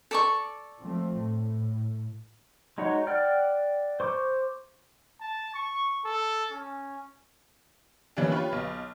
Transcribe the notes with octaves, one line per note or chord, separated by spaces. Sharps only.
A4 D5 C#6
F3 A3 C4
A2
G#3 D#4 F#4 C#5
D5 F#5 G5 F6
C5 C#6 D6
A5
C#6
A4
C#4
E3 G3 A#3 B3 C#4 D4
F4 G4 B4 C#5
B1